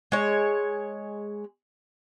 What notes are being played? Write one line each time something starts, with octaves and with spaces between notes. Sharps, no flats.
G#3 C#5